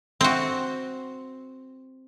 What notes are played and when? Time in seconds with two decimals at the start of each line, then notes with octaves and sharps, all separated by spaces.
0.21 C4 F#4